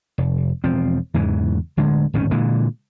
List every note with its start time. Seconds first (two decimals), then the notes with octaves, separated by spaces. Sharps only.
0.18 F1
0.64 E1 F3 C4
1.14 E2 G#2 C#3 E3
1.77 D1 D3 G#3
2.14 D1 G#1 D#3 C#4
2.31 A#2 D3 E3 G#3